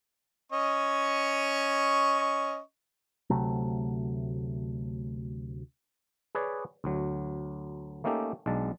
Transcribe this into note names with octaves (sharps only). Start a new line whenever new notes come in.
C#4 D#5 C#6
D2 C3 F#3 A3
G#4 B4 C#5 D5
D2 F#3
A3 A#3 C#4 D#4 G4 A4
B1 G#3 D4 A5